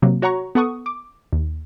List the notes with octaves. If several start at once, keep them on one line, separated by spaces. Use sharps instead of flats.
C3 F#3 A#3
F#4 C#5 F#5 A#5 C#6
B3 A4 F#5 C#6 D#6
D6
D#2